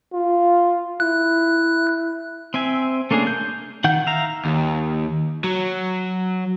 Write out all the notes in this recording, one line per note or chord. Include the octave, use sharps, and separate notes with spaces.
F4
E4 F#6
C4 E5 G#5
A3 A#3 C#4 D4 G#4
G6
D#3 F#5 G6
E5 F5 A#5
D#2
F#3